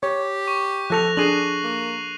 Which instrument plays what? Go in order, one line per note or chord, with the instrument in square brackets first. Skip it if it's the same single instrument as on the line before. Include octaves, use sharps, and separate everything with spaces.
[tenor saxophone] G4 [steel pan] C#5
[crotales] C#6
[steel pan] F3 A4 [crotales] F#6 A#6 F7
[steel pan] D4 G#4 [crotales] C7 D#7 F#7
[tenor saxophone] A#3